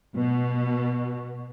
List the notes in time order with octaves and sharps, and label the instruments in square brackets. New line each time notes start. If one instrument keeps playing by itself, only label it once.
[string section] B2